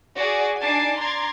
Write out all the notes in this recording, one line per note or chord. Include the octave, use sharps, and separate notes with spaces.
F#4 G#4 D5
D4 D#4 G#5 A5 D6 C7
A#5 C6 D6 G#6 A6